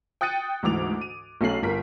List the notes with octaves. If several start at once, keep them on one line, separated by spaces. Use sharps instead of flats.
G5 D#6 F#6 A6 C#7 D#7
D2 G#2 E3 D6 F7
D#7
B1 A3 C#4 C7 F#7
G1 A#4 B6